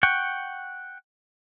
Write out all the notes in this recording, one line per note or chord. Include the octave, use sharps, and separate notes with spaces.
F#5 G5 C#6